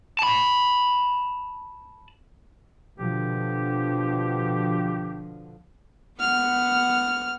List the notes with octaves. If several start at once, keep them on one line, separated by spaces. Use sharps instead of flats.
A5 B5
B2 D3 F3 G4
B3 F#5 F6